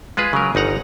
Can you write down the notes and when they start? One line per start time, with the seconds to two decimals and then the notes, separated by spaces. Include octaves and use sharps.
0.17 G#3 F4 G#4 B4
0.33 C#3 F#3 A#4
0.55 G1 D#4 F#5 A#5